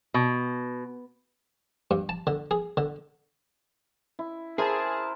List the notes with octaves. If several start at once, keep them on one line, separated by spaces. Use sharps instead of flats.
B2
G2
A5
D3
G#4
D3
E4
E4 G#4 A#4 C5 A5